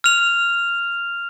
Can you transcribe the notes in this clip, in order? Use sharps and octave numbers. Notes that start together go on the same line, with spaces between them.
F6 F7